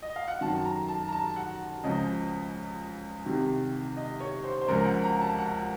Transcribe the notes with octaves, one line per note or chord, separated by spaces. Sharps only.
D#5
F5
F#5
F#2 D#3 A5
A#5
A5
A#5
A5
F#5
C#2 C#3 F3 D#5
C2 C3 D#3
D#5
C#5
C5
C5
C#2 C#3 F3 A#4
F#5
A#5
A5
F#5